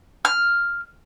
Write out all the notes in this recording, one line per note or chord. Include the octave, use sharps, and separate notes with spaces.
F6